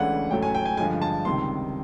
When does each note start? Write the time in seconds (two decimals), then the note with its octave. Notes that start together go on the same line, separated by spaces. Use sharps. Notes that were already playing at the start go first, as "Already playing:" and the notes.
Already playing: C#2 C#3 E3 A3 D4 F#5
0.31 A1 A2 F#3 A3 G5
0.43 G#5
0.55 G5
0.66 G#5
0.77 G2 D3 F3 G#3 G#5
1.02 A5
1.25 C#2 C3 D#3 G3 C6